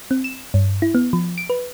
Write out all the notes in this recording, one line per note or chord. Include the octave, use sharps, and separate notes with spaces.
C4
E7
G2
E4
B3
F3
D7
B4